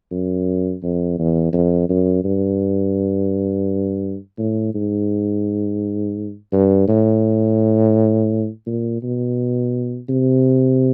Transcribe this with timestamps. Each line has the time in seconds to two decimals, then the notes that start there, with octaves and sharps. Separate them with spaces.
0.11 F#2
0.83 F2
1.19 E2
1.53 F2
1.89 F#2
2.24 G2
4.38 A2
4.75 G#2
6.53 G2
6.88 A2
8.66 A#2
9.03 B2
10.09 C3